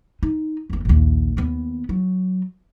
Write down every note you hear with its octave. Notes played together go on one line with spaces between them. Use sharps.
D#4
F#1 E2
A#1 D#2
D#2 B3
F#3